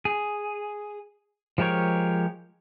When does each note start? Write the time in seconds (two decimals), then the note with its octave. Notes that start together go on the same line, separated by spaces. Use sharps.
0.05 G#4
1.58 F3 G#3 G4 A#4 C#5